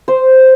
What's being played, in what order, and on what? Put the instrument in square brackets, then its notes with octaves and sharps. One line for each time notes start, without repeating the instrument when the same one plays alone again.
[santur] C5